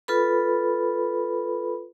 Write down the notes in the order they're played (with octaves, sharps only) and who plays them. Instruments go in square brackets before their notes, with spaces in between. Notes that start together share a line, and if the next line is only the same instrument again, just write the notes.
[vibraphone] F4 A4 B4 B5